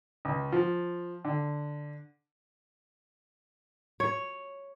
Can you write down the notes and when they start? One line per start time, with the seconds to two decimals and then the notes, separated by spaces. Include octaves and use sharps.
0.25 C#2
0.52 F3
1.25 D3
4.00 C#5